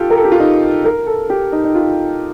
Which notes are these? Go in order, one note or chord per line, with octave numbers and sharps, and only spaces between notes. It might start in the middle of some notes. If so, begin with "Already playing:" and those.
Already playing: F4 G4 A4
A#4
A4
G4
F4
D#4
A#4
A4
G4
D#4
D#4
F4